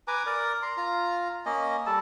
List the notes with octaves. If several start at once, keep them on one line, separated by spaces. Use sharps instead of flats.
B4 G#5 A#5 D6
A#4 D5
A#5 C6
F4 A#5
A#3 C#4 D#5
G3 A4 A5